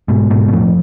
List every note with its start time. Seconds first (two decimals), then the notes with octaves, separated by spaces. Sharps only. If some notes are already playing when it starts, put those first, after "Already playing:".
0.08 G#2 B2
0.30 G#2 B2
0.48 B2
0.53 F2 A2